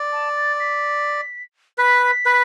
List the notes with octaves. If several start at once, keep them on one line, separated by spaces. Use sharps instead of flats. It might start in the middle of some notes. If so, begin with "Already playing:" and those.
Already playing: D5
A5
A6
B6
B4 B6
B4